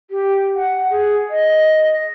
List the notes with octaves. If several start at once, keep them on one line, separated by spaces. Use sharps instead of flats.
G4
F#5
G#4
D#5